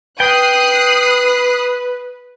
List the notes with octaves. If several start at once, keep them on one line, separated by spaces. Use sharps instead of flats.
B4 G5 D#6 F#6 C7